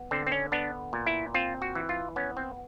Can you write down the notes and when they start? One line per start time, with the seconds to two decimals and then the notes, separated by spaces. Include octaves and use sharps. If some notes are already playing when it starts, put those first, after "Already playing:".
Already playing: B3
0.11 D3 C4
0.27 C4
0.32 C#4
0.52 B3 D4
0.93 A#2
1.06 E4
1.34 C4 F4
1.62 F#4
1.75 E3
1.89 F4
2.16 B3 C#4
2.37 C4